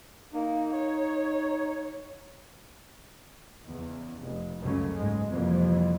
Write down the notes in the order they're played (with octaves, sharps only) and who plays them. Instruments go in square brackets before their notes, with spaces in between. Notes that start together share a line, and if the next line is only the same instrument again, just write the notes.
[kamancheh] A#3 [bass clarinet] D#4
[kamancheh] C#5
[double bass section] E2 C#3
F1
C#2 F#2 C#3 F#3 A3 C#4
F#1 G#2 G#3
F2 C3 E3 G3 A#3